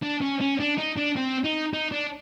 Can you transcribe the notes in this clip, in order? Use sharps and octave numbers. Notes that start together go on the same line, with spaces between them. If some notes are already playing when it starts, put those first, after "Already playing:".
D4
C#4
C#4
D4
D#4
D4
C4
D#4
D#4
D4